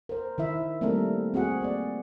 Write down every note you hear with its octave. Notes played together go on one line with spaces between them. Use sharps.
A#4 C5
D#3 E4 E5
G3 A3 A#3 C4 A4 A#4
C4 F#4 G#4 F#5
A#3 C4 D5